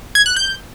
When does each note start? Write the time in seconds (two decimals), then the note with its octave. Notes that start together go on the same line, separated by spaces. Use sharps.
0.15 G#6
0.26 F#6
0.36 G6